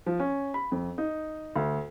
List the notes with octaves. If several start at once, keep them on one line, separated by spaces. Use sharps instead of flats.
F3
C#4
B5
F2
D#4
D2